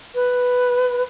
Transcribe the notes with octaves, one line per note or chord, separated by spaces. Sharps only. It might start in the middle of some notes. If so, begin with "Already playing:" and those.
B4